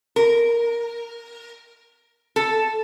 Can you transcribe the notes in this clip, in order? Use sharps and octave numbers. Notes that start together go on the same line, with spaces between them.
A#4
A4